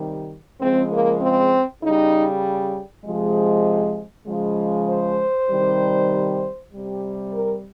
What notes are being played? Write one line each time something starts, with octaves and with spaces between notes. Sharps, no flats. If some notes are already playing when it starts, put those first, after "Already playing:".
Already playing: C3 D#3 G3
C#3 F3 G#3 C4
A#3
C4
C#3 G3 D#4
C3 F3 G#3
C#3 F3 G#3
C5
C3 D#3 G3
C3 G3
A#4